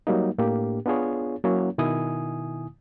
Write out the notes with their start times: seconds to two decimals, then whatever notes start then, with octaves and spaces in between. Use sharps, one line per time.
0.07 F#3 G3 A#3 D#4
0.38 A2 A#3 D4 G4
0.86 B3 D4 F4 G#4 C#5
1.44 F#3 A#3 C#4 E4 C#5
1.78 B2 D#3 E4 G#5 D#6